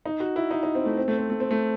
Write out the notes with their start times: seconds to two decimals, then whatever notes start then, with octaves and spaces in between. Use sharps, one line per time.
0.06 D#4
0.20 F#4
0.36 E4
0.51 D#4
0.63 D#4
0.75 C4
0.85 A3
0.97 C4
1.08 A3
1.18 C4
1.30 A3
1.40 C4
1.51 A3